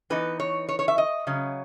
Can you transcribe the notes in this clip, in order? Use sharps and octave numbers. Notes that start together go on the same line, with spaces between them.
E3 B3 D#4 B4
C#5
C#5
C#5
E5
D#5
C#3 F#3 C#4